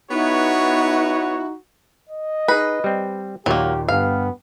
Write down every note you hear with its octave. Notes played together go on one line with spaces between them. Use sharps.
B3 D#4 E4 F#4 C#5
D#5
D#4 G#4 B4
G3 C4
D#2 A#2 F#3 A#3 G4
G1 G2 B3 F5